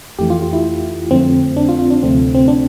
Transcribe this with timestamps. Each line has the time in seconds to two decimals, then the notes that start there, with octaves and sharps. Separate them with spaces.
0.19 F2 E3 A3 G4
0.30 F4
0.42 F4
0.53 E4
1.11 F2 D3 F3 A3 C4
1.56 D4
1.69 F4
1.79 F4
1.90 D4
2.03 D2 C3 F3 A3 C4
2.35 C4
2.48 D4